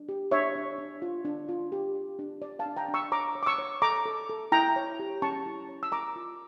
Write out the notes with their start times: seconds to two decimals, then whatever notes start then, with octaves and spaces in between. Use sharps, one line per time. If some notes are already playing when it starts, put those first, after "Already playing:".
Already playing: D4
0.09 G4
0.31 D4 C#5 E5
0.55 D4
0.78 D4
1.02 F4
1.25 D4
1.49 F4
1.72 G4
1.95 G4
2.19 D4
2.42 D4 D5
2.59 F5 A5
2.66 D4
2.77 G5 A#5
2.88 D4
2.94 C#6 E6
3.12 C#5 A#5 D6
3.35 C#5
3.43 D6
3.46 C#6 E6
3.58 C#5
3.82 A4 A#5 D6
4.06 A4
4.29 A4
4.52 E4 G5 A#5
4.76 C#5
4.99 G4
5.22 C#4 A5 C#6
5.46 E4
5.69 C#5
5.83 E6
5.92 A#4 A#5 D6
6.16 F4